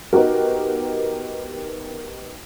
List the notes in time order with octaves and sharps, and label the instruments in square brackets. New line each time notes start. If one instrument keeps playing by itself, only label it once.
[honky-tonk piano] B3 D#4 F#4 G4 A#4